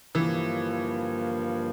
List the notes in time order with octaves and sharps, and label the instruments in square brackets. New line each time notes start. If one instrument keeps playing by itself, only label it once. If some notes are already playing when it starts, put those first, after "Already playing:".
[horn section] G2 D3 F3 A#3 [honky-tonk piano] E3